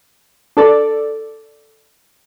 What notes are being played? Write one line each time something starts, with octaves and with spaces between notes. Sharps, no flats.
D4 A4 D5